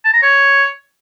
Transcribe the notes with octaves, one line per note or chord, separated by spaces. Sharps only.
A5
A#5
C#5